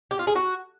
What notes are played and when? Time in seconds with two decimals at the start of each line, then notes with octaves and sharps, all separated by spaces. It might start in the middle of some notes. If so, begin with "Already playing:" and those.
0.11 G4
0.19 F4
0.27 G#4
0.35 F#4